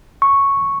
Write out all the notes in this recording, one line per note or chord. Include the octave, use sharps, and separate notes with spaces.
C#6